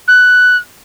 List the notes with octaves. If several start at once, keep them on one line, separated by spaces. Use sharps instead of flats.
F#6